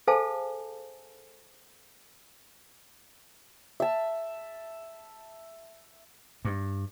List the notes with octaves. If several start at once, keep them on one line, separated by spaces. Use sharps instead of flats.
G#4 A4 C5 F5 G#5 A5
E5 A5
G2